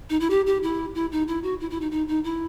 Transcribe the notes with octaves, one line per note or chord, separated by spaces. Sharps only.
D#4
E4
G4
G4
E4
E4
D#4
E4
F#4
E4
E4
D#4
D#4
D#4
E4